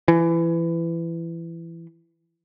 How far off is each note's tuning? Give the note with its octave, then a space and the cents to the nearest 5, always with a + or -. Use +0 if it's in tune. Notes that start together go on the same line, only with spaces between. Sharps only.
E3 +20